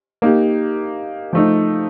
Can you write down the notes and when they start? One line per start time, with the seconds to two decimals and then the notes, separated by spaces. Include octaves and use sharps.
0.22 A#3 D#4 G4
1.33 F3 A3 D#4